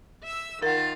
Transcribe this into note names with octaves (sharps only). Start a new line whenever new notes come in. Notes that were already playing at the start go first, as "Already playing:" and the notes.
E5 E6
D#3 F4 A#4 F5 F#5 A6